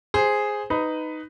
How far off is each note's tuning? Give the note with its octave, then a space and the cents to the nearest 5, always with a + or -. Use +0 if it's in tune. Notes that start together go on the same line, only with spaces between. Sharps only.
G#4 +0 C5 +0
D#4 +0 B4 +15